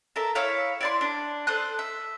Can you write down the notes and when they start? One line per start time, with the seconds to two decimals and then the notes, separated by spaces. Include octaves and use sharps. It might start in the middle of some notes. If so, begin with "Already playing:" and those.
0.16 A4 A#4 E5
0.35 E4 C#5 E5 F5
0.81 E4 D5 C6
1.01 D4
1.47 A4 C5 D#6 F#6
1.79 E5